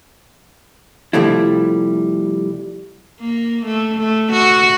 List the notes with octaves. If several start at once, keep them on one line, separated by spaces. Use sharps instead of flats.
C3 F3 G3 A3 E4
A#3
A3
A3
F#4